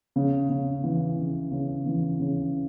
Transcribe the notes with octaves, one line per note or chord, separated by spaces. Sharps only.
C#3
C#3
E3
C#3
C#3
E3
C#3